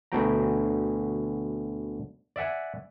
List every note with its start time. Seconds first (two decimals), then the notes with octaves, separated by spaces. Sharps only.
0.12 D2 B2 G5 A#5
2.36 D5 E5 F#5 G#5